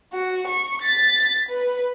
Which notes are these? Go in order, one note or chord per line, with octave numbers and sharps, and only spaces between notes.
F#4
C#6
A6 B6
B4